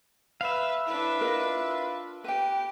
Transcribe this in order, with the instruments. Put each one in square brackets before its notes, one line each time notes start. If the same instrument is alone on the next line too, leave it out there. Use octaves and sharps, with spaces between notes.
[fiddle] B4 [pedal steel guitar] E5 F5
[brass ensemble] F2 A2 E4 [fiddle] D4 B4
[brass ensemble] F4 [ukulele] A#4 D#5
[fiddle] G4 [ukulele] B4 G5